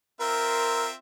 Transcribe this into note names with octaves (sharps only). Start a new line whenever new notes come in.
C4 F4 A#4 E5